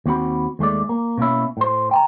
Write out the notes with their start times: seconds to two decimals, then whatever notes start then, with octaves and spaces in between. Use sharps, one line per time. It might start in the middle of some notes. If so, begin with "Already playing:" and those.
0.06 D#2 C4 F#4 B5
0.59 D#2 G#3 A3 D5
0.89 A#3
1.18 B2 A#3 C#4 E4
1.57 A2 C5
1.91 G5 A5 A#5